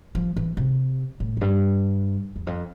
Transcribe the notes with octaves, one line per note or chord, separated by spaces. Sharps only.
F3
E3
C3
A2
F2
G2
E2
F2